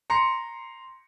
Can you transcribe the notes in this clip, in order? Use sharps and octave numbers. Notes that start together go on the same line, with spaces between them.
A#5 C6 C#7